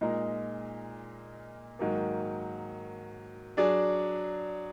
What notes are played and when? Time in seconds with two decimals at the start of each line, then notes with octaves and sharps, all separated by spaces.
0.01 A#2 G#3 D#4 A#4
1.79 G#2 D#3 F#3 A#3
3.57 F#3 D4 G#4 D5